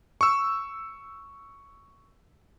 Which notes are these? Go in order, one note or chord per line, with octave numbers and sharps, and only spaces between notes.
C#6 E6